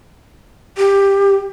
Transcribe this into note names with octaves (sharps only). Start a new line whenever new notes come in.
G4